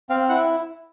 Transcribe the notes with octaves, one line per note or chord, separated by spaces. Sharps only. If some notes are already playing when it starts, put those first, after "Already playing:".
C4 F5
E4 F#5